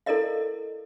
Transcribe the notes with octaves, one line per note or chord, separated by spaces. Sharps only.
E4 A4 A#4 D5 D#5 F5